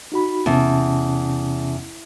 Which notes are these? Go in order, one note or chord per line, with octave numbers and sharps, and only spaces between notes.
D#4 F#4 B5
E2 C3 C#4 A5